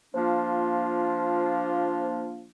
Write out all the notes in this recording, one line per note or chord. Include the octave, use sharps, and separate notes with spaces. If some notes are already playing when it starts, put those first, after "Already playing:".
F3 A#3 D4 F4